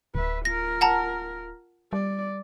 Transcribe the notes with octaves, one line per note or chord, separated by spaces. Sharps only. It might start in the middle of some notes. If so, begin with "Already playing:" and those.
D1 B4 E5
F4 A#4 A#6
F#5 A5 A#5
G3 D5